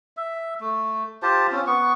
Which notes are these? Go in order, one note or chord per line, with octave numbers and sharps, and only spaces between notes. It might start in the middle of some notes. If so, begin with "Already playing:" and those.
E5
A3
F4 G4 C5 A5
C4 C#4 F4
B3 C#6